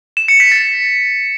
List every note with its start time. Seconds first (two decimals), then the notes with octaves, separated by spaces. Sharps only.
0.17 E7
0.28 C#7
0.40 B6
0.52 A6